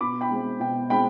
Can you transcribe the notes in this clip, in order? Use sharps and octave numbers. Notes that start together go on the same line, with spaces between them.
B2 B5 D6
G5 B5
G#3 C4
B2 G5
G#3 C4 G5 B5